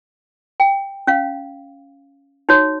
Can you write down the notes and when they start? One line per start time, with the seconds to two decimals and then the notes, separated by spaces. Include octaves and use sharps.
0.60 G5
1.07 C#4 F5
2.49 D#4 F#4 C#5